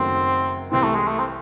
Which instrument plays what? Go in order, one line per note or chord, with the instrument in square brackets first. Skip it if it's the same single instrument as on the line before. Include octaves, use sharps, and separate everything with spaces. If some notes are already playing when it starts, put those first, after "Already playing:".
Already playing: [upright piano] F#1 F#2 D#3 F#3 A3 [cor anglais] C4
[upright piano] C2 C3 E3 [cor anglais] C4
[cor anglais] A3
G#3
A3
C4